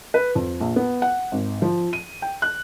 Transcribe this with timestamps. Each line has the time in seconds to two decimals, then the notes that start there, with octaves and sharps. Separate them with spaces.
0.14 B4
0.35 F2
0.60 A#1
0.76 B3
1.02 F#5
1.32 G#1
1.62 F3
1.93 D#7
2.22 G5
2.42 F#6